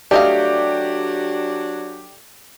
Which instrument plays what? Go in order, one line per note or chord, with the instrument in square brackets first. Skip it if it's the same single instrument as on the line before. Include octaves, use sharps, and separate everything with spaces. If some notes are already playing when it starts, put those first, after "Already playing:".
[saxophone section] F#3 D4 [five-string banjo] A3 D#5 F5 [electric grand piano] G4 [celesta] D5